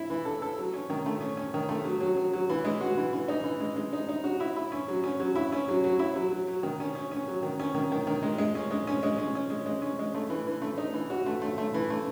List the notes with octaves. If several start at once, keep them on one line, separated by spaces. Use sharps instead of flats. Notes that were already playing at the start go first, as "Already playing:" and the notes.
Already playing: E4
E3
A4
A4
F#3
C#4
D#3
A3
C#4
C#4
D#3
A3
F#3
F#3
F#3
F#3
E3
G#3
F#4
E3
E3
D#4
E3
G#3
G#3
D#4
D#4
F#4
E4
E4
C#4
F#3
C#4
F#3
E4
C#4
F#3
F#3
E4
F#3
F#3
F#3
D#3
C#4
C#4
C#4
F#3
D#3
C#4
D#3
D#3
D#3
G#3
G#3
C#4
G#3
C#4
G#3
C#4
C#4
G#3
G#3
C#4
G#3
A3
E3
E3
A3
D#4
E3
F#4
A3
A3
A3
E3
A3